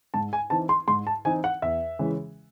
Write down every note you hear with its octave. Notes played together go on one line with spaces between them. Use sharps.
G#2 A5
G#5
E3 C4 D#4 A5
C6
G#2 C6
A5
E3 C4 D#4 G#5
F#5
E2 E5
C#3 E3 G#3 C#4